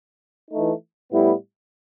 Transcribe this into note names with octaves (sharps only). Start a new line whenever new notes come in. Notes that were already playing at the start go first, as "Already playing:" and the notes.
E3 A3 D#4
A2 G3 B3 E4